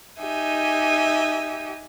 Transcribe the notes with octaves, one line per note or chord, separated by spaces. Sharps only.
D#4 G4 E5 G#5